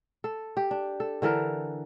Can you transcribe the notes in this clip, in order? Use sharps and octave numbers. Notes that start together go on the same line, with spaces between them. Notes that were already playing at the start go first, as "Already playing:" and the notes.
A4
G4
D4
A4
D3 E3 A4 A#4